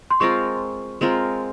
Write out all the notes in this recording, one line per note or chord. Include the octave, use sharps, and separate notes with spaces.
C6
G#3 C4 F4 A#4 C#6
G#3 C4 F4 A#4